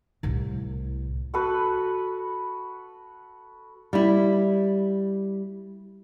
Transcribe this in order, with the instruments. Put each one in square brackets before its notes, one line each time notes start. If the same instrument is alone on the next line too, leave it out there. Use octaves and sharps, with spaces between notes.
[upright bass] C2 A2
[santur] F#4 A4 B4
[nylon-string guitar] G3 E4